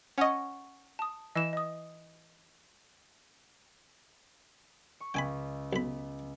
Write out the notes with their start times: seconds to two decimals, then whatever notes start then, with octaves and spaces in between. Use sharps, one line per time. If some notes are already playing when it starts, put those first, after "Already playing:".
0.18 C#4 D#5 F#5 C#6
0.99 A5 D#6
1.35 E3 D#5 E7
1.53 D#5 D#6
5.00 C#6
5.14 C#2 G5 G#5 B5
5.73 B1 B5